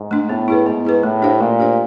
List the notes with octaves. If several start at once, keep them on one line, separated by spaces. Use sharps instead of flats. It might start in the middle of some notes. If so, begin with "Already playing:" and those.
Already playing: G#2
A3 D4
A2 B3
E4 G#4 B4
G#2 B3
E4 G#4 B4
A2 A3
D4 G4 C5 F5
A#2 A3
D4 G4 C5 F5